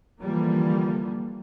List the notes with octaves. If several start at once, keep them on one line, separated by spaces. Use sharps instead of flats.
D3 E3 F3 G3 A#3